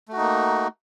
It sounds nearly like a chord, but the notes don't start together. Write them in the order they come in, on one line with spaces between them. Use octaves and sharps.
A3 F#4 D#4 A#3